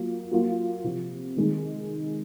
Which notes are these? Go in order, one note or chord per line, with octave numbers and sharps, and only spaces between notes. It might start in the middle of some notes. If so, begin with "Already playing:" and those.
Already playing: F#3 A#3 F4
F#3 A#3 F4
C3 F3 C4
D#3 G#3 D#4